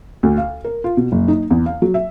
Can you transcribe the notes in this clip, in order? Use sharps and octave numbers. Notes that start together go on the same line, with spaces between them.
D2
F5
A#4
F4
B2
F#1
D#4
E2
F5
F#3
E5